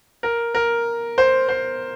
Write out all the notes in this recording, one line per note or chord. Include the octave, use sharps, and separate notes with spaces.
A#4
A#4
C5
C5